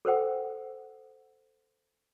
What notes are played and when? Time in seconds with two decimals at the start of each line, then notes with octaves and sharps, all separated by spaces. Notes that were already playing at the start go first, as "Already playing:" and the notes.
0.05 A4 A#4 C5 F#5 G5